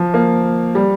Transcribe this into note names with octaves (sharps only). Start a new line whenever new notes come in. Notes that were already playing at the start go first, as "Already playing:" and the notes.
Already playing: F3
A#3
G3